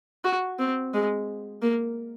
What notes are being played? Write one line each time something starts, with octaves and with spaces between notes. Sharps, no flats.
F#4
C4
G#3
A#3